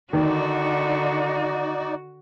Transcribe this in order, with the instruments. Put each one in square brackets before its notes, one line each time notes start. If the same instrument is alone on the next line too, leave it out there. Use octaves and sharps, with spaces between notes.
[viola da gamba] D3 [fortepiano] D#3 [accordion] D#4 D5 [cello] F#4